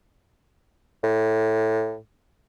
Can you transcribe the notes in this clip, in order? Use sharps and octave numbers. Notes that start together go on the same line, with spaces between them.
A2